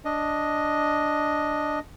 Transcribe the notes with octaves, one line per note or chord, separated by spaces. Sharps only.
D4 D#5